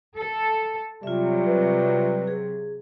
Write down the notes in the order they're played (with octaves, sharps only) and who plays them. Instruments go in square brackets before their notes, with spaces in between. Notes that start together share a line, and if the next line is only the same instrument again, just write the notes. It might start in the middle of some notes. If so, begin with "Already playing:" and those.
[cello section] A4
[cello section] C3 F#3 [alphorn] G3 [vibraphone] F4 E5
[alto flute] B4
[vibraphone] G#4